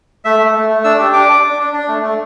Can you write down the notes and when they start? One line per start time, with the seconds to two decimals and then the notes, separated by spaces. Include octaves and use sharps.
0.25 A3 E5
0.40 A3
0.55 A3
0.70 A3
0.84 D4 E6
0.99 G4
1.14 D4 D6
1.29 D4
1.44 D4
1.59 D4
1.73 D4
1.88 A3
2.03 A3